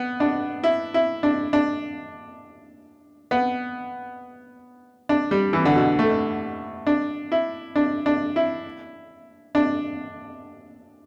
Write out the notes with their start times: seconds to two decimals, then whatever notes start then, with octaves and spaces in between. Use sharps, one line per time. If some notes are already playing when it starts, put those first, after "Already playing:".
Already playing: B3
0.20 D4
0.64 E4
0.94 E4
1.23 D4
1.53 D4
3.31 B3
5.09 D4
5.31 G3
5.53 E3
5.65 D3
5.76 B2
5.99 A3
6.87 D4
7.32 E4
7.76 D4
8.06 D4
8.36 E4
9.55 D4